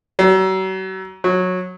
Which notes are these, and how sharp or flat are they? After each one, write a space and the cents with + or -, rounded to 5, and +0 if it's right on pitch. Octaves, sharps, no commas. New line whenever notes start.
F#3 +40
F#3 -15